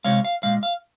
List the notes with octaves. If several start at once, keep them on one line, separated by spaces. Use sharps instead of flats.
C3 F3 G#3 C#5 F5
F5
A#2 G#3 F5
F5